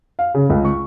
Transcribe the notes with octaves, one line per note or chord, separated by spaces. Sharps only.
F5
C#3
C#2
C#6